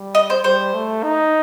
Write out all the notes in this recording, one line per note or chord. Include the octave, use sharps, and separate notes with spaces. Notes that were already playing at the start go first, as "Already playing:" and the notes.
Already playing: G3
D#5
C5
G3 C5
A3
D#4